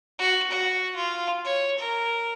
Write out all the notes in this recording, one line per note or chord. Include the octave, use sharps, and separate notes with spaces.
F#4
F#4
F4
C#5
A#4